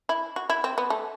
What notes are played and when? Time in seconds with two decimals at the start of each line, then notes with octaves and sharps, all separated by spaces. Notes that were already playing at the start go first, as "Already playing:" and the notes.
0.09 E4
0.36 F#4
0.50 E4
0.64 C4
0.78 B3
0.90 A3